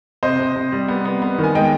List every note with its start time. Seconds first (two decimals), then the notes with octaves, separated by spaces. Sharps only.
0.23 C3 C5 D#5
0.39 C3
0.56 C3
0.72 G3
0.88 B3
1.05 B3
1.22 B3
1.38 D#3
1.44 G#5
1.55 G#3 D#5 G5